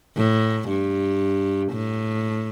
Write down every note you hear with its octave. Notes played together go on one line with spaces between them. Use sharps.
A2
G2
A2